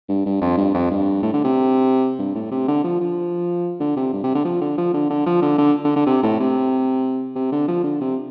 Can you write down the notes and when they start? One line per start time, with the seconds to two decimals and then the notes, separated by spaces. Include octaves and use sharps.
0.09 G2
0.26 G2
0.41 F2
0.57 G2
0.74 F2
0.91 G2
1.23 A2
1.33 D3
1.44 C3
2.19 G2
2.35 A2
2.51 C3
2.68 D3
2.84 F3
3.00 F3
3.80 D3
3.97 C3
4.13 G2
4.24 C3
4.35 D3
4.45 F3
4.61 D3
4.78 F3
4.94 D3
5.10 D3
5.26 F3
5.42 D3
5.58 D3
5.85 D3
5.96 D3
6.06 C3
6.23 A2
6.40 C3
7.36 C3
7.52 D3
7.68 F3
7.84 D3
8.01 C3